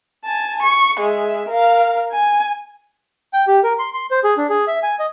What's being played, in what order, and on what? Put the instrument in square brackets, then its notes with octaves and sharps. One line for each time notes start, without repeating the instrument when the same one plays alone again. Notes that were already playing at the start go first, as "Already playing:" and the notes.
[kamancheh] G#5 A5
C#6
G#3 E5
A#4 F5
G#5
[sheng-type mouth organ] G5
G4
A#4
C6
C6
C5
G#4
D4
G#4
E5
G#5
D#5